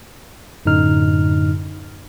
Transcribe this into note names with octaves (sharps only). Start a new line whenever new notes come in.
F#2 A2 D3 D#4 F6